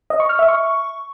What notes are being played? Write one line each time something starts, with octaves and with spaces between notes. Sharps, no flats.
D#5
C#6
F6
E5
C#6